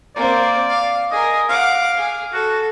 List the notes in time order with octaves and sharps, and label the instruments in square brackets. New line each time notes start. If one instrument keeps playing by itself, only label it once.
[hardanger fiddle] A#3 C4 [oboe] D5
[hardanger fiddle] F5
[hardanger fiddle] G#4 A#4 [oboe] D#5
[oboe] F5 [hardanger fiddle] F#5 D6
[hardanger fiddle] G#4
[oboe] F#4 [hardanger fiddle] A4